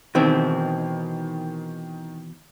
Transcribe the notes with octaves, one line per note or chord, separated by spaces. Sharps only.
B2 D#3 E3 C4